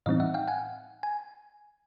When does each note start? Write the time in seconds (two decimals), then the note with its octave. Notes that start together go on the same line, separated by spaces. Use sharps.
0.06 A2 E3 G3 C4 D#4 D#5 F5
0.20 E5 F#5
0.34 F5 G5
0.48 F#5 G#5
1.03 G#5